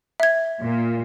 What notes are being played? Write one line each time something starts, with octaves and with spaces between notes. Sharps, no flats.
E5 G#6
A#2